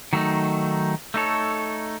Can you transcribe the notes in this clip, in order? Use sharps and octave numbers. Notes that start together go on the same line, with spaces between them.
D#3 F#3 A3 D#4
A3 D#4 A4 C#5